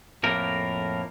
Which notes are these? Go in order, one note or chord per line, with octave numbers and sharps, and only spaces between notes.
F2 A2 A#3 A#4